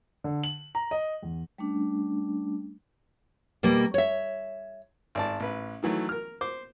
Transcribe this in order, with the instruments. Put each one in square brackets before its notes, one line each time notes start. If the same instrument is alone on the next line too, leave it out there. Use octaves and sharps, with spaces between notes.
[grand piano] D3
F#7
A#5
D#5
E2
[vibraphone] G3 A3 C#4 D4
[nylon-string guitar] B2 G3 A#3
C#5 E5
[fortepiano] G#1 D5 A5
A1 B4
D#3 E3 F#3 A3
A#4 F6
C5 D6